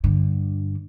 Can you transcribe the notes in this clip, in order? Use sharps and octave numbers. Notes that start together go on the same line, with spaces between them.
G2 D3